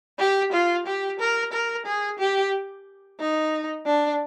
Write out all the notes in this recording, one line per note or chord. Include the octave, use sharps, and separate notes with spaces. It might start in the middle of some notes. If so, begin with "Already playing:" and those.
G4
F4
G4
A#4
A#4
G#4
G4
D#4
D4